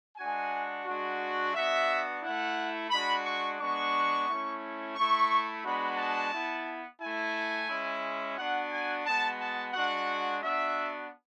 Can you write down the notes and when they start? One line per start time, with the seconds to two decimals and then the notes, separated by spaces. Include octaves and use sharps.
0.17 G#3 D4 F#4 G#5
0.86 G#3 D4 F#4
1.54 B3 D4 F#4 E5
2.22 A3 E4 F#5
2.91 G#3 D4 F#4 B5
3.24 C#6
3.59 G#3 B3 D4 F#4 C#6
4.28 A3 C#4 E4
4.95 A3 E4 C#6
5.64 G#3 B3 D4 F#4 B5
5.98 A5
6.31 B3 E4
7.00 A3 E4 G#5
7.68 G#3 C#4 E4
8.36 B3 D4 F#4 F#5
8.70 G#5
9.05 G#3 B3 F#4 A5
9.40 A5
9.73 G#3 D4 F#4 F#5
10.42 B3 D4 F#4 E5